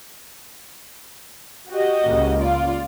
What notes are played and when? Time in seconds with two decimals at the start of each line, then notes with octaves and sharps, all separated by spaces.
1.70 F#4 G4 D#5
2.05 C#2 C#3 A#3
2.39 F4 D5